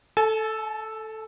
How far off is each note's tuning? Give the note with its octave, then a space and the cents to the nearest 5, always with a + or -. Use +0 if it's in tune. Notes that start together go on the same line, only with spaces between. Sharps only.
A4 +0 G#5 +45